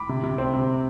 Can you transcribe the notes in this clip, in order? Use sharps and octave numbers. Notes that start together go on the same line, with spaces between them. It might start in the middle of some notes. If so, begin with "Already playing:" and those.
Already playing: B5 D6
C3
C3
C4
C3